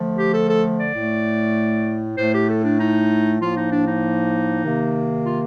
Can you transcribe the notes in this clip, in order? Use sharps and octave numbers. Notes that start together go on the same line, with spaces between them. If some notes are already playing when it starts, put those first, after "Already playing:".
Already playing: D3 F3 A3
G4
A4
A4
D5
A2 A3
A2 A3 C5
G4
A4
D4
D#4
A2 F3 A#3 F4
D#4
D4
D#4
C3 D#3 A#3
F4